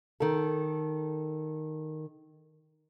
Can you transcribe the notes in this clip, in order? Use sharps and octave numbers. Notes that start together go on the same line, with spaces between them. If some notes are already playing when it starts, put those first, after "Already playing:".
D#3 A4